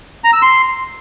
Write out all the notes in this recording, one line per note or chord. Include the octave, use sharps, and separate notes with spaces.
A#5
E6
C6